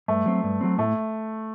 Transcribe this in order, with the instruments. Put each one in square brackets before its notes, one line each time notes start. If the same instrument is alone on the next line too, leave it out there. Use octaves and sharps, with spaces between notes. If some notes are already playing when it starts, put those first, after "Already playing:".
[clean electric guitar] G2 [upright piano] A3
[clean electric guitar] F#3 C4
G2
F#3 C4
[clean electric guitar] A2 [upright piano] A3